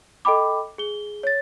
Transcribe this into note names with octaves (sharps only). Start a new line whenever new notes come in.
A4 D#5 G5 B5 D6
G#4 G7
C#5 A6